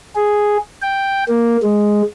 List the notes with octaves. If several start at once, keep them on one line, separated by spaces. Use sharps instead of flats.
G#4
G5
A#3
G#3